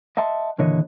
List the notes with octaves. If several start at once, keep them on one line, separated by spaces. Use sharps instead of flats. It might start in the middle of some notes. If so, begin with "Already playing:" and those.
D#5 E5 F#5 A5 C6
D#2 A#2 D3 E3 C#5 D#5